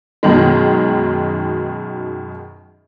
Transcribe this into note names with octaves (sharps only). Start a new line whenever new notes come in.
F#2 B2 D#3 G#3